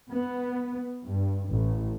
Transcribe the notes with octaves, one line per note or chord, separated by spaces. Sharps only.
B3
G2
A1